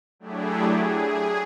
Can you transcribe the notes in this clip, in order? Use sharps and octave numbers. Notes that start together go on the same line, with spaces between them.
F#3 A3 D4 E4 G4 G#4
G#4